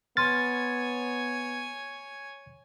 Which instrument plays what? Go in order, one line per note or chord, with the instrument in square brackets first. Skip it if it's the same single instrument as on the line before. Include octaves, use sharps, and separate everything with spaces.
[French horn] B3 [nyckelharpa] C#5 G#5 [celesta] C6 F6 [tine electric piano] A6